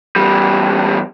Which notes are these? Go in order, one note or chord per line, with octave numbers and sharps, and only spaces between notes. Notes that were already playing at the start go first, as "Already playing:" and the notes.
E2 G3